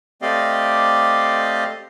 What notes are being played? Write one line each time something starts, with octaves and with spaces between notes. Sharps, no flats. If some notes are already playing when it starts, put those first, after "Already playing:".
A3 C4 G4 D5 D#5 F5